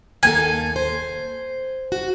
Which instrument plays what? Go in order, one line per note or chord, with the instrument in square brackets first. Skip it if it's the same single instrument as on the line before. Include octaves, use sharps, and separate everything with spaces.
[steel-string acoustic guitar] D#2 A#3 A4 [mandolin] G#5
[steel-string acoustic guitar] C5
F#4